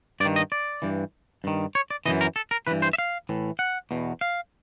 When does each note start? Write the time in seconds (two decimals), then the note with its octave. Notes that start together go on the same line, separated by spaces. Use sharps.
0.20 G2 D5
0.25 D#3
0.36 D#5
0.52 D5
0.82 G2 E3
1.44 G2 D#3
1.75 C#5
1.90 D5
2.06 F#2 C#3 E3 D#5
2.21 A#4
2.36 A4
2.51 A#4
2.67 G2 E3 B4
2.82 C5
2.93 E5
2.98 F5
3.29 A2 E3
3.59 F#5
3.91 E2 B2
4.21 F5